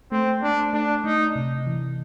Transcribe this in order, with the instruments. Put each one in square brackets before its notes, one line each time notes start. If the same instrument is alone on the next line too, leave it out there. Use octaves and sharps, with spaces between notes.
[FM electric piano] A3 [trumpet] C4
[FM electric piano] A3 [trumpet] D4
[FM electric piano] A3 [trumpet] D4
[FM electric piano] A3 [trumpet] D#4
[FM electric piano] C3
E3